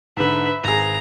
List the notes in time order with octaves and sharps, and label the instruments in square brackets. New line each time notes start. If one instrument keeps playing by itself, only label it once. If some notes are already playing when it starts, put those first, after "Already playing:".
[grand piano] G#2 D3 [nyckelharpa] B4 E5
[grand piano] G#1 G#4 [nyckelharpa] A#5